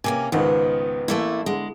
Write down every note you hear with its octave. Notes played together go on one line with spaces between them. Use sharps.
C3 A#3 C#4 G#5
C#2 G#2 D#3 B3
A1 A3 A#3 E4
D3 G#3